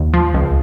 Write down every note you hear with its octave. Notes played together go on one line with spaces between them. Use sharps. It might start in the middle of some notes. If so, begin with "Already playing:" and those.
Already playing: D#2
F3
C#2